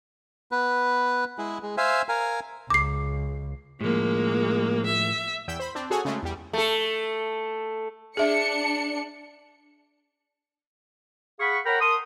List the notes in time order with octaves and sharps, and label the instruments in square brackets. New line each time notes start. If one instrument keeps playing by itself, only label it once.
[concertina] B3 B4
G#3 E4 G#4
G#3
C5 E5 F5 G#5
A#4 F5 G#5
[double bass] C#2 [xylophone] D6 C7
[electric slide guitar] A2 F3 [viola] G#3 A#3
[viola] E5
[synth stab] E2 G5 E6 B6
C5 B5
C4 D4
F#4 G#4 A4 C#5 F#5 G#5
C#3 G#3 A3
E2 G3
[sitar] A3 A4
[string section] D4 C#7 [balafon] G#4 E5
[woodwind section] G#4 F5 F#5 B5 C#6
A#4 C#5 F#5 G5 A#5 B5
A#4 A5 C6 D#6